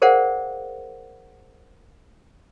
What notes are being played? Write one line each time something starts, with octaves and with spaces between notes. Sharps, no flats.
G#4 A#4 C5 D5 F5 F#5